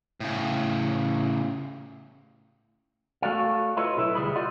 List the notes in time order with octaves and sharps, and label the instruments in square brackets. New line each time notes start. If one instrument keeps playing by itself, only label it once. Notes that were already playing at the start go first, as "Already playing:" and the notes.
[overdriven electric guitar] A2 C#3
[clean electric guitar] A3 F#4 A4 D5 F5
E4 F4 A4 B4 C#5 D#5
B1 E4 A4 B4 E5
D2 G3 G#4 B5
F4 G4 D5 D#5 F#5